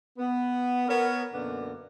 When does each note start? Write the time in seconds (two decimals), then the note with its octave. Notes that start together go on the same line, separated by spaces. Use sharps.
0.18 B3
0.88 B3 A#4 C#5
1.34 F#2 B2 D3 A#3 B3 D5